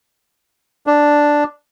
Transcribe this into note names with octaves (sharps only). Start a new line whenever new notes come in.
D4